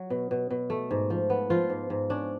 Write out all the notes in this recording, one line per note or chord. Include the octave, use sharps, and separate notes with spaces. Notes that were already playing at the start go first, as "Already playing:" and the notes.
Already playing: F#3
B2
B2
B2
A3
G#2
F3
B3
F3 F4
G#2
G#2
C#4 D4